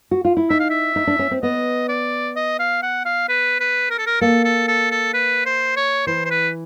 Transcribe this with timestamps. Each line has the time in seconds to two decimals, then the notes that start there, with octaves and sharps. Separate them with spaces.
0.11 F#4
0.25 F4
0.37 E4
0.50 D#4 E5
0.60 F5
0.70 E5
0.96 D#4
1.07 D4
1.19 C#4
1.31 C4
1.42 B3 D#5
1.89 D5
2.36 D#5
2.59 F5
2.83 F#5
3.05 F5
3.29 B4
3.60 B4
3.90 A#4
3.98 A4
4.06 A#4
4.21 A#3 A4
4.45 A4
4.68 A4
4.91 A4
5.14 B4
5.46 C5
5.77 C#5
6.07 E3 C5
6.25 C5
6.31 B4